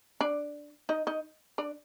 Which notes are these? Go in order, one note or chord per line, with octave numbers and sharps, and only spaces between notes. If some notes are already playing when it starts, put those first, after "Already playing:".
D4 D5
D#4 D#5
D#4 D#5
D4 D5